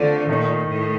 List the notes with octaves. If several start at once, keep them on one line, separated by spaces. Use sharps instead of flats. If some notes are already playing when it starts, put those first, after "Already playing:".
Already playing: D3 A3 C4 F4
A#2 D#3 A3 D#4
A2